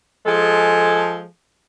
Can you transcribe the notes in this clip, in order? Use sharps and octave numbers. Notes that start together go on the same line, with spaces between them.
F3 G#3 G#4 A4